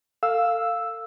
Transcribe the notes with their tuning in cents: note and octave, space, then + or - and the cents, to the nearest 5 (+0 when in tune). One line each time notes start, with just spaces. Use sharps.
A4 +35 F5 +0 E6 +0